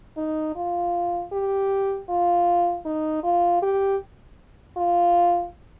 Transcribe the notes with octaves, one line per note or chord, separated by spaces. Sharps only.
D#4
F4
G4
F4
D#4
F4
G4
F4